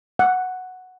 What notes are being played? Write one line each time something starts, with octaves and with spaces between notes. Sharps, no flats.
F#5